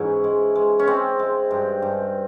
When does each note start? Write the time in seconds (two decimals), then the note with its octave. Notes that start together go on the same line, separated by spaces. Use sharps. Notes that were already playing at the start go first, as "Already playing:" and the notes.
Already playing: G#2 E3 C#4 E4
0.24 G#3
0.55 G#3
0.79 C#4
0.87 G#3 C4
1.19 G#3
1.51 G2
1.82 G2